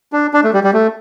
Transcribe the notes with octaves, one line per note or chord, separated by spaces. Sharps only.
D4
D4
A3
G3
G3
A3